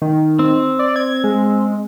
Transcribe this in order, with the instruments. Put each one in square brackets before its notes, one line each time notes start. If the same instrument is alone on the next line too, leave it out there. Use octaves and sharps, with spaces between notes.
[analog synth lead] D#3
[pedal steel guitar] C4
[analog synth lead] D5
G#6
G#3